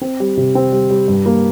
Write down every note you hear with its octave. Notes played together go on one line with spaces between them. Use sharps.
C4
G3
C3
C4
G3
G3
G2
A#3